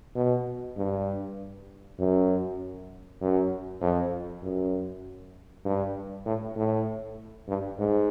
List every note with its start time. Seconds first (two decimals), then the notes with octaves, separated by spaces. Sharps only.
0.16 B2
0.77 G2
1.99 F#2
3.21 F#2
3.82 F2
4.43 F#2
5.65 G2
6.26 A2
6.56 A2
7.48 G2
7.79 G#2